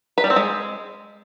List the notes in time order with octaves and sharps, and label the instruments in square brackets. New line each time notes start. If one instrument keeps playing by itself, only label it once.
[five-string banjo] B4
G3
C4
G#3